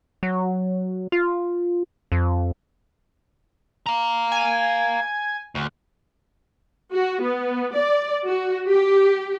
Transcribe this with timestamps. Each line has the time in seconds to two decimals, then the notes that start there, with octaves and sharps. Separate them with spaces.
0.23 F#3
1.12 F4
2.12 F2
3.86 F5 A#5
4.32 G#5
5.55 D2
6.93 F#4
7.23 B3
7.75 D5
8.26 F#4
8.68 G4